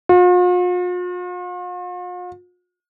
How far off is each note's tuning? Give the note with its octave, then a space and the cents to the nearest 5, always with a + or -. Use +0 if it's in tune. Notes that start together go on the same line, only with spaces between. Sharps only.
F4 +45